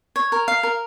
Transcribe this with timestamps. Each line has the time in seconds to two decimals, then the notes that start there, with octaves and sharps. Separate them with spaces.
0.16 C#5
0.32 A#4
0.48 F5
0.63 A#4